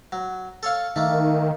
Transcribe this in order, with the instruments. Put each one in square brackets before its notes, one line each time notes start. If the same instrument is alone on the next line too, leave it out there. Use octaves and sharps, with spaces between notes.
[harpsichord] F#3
A4 C#5 F5
[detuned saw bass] D#3 [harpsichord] A3 A#3